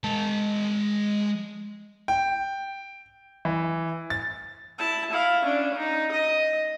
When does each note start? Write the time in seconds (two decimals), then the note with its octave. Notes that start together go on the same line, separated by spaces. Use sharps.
0.04 G#3 A5
2.08 G5
3.45 E3
4.10 A6
4.79 E4 A5
5.10 E4 F5
5.43 C#4 D4
5.78 D#4
6.12 D#5